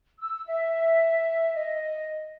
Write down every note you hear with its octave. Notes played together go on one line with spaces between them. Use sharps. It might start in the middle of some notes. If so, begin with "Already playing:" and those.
E6
E5
D#5